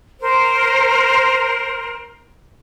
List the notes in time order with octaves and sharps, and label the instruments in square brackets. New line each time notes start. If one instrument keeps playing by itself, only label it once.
[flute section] A#4 C5